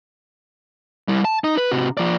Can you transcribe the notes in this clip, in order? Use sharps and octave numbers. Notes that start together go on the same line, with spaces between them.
G3 E4
A5
D#4 D#5
B4
C3 F#4
F3 D5